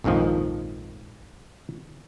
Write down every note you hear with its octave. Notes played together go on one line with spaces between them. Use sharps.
A#1 F2 G#2 D#3 F3